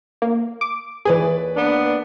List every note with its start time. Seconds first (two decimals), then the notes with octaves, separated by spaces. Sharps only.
0.22 A#3
0.61 D6
1.05 D#2 E3 G#4 B4 D5
1.56 A#3 B3 D4